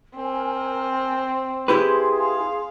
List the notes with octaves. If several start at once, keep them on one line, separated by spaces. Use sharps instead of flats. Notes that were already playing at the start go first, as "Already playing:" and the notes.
C4 A#4 G#5
E4 G4 G#4 B4 C6
F5